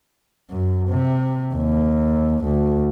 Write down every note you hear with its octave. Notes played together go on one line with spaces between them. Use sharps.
F#2
C3
D#2
D2